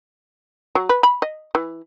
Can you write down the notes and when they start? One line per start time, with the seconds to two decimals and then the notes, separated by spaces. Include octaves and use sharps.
0.75 F#3
0.89 B4
1.03 B5
1.22 D#5
1.55 E3